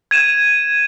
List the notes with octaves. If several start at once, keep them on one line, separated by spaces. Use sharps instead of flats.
G#6 D#7 E7